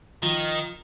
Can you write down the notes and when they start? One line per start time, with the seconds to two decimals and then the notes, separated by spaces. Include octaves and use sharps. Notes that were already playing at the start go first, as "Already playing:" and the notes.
0.23 D#3 F3